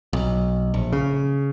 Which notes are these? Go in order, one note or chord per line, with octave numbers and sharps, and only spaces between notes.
B1
A#1
C#3